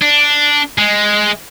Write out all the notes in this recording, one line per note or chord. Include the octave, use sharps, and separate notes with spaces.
D4
G#3